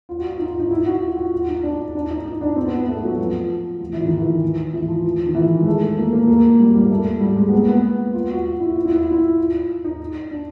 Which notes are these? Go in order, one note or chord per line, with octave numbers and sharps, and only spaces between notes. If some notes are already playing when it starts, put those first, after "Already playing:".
F4
F#4
F4
D#4
F4
D#4
E4
F#4
F4
F#4
F4
D#4
D4
D#4
D4
D#4
D#4
D4
C4
B3
B3
A3
F#3
F3
F3
E3
D#3
E3
E3
F3
F3
D#3
E3
G#3
A3
A#3
A#3
A#3
G3
G3
A#3
A3
G3
G#3
B3
A#3
B3
F4
F#4
F4
E4
F4
E4
F4
E4
F4
D#4
D4